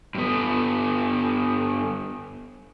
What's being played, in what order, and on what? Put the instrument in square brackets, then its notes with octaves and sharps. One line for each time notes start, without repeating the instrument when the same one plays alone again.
[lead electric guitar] G2 B3